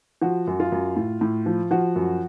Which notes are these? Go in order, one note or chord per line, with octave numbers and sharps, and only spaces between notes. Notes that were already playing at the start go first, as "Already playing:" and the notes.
F3 F#4
F#2
F4
F#2
A2
A2
F3
F3 F#4
F#2